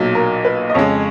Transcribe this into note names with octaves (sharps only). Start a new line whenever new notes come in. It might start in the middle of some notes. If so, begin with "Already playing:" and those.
Already playing: B1 A#2 F#3
A#4
B4
D#5
F2 C#3 G#3 C#5